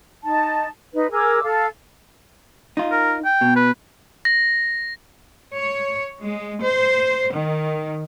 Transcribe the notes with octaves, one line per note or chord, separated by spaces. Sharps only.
D#4 A5
D#4 B4
G#4 A#4 D6 E6
A4 F5
D#4 F4
A#4
G5
B2
B4
A#6
C#5
G#3
C5
D#3